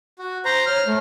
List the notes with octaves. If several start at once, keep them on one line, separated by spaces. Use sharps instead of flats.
F#4
C5 A#5
C#5 F6
A3